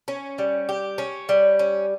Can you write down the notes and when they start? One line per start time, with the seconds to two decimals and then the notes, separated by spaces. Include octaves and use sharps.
0.08 C#4
0.38 G3
0.69 G4
0.98 C#4
1.29 G3
1.59 C#4